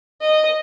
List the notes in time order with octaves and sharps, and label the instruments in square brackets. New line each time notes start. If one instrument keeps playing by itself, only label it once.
[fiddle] D#5